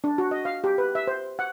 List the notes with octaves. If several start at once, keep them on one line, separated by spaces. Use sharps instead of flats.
D4
F#4
D#5
F5
G4
B4
E5
C5
F#5